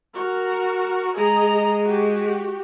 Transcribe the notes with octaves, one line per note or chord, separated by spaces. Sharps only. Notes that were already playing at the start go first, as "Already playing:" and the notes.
F#4 A#4
G#3 G#4 D#5 A#5
F#4 G4